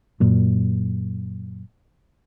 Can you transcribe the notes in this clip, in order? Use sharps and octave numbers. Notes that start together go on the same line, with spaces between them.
F#2 A#2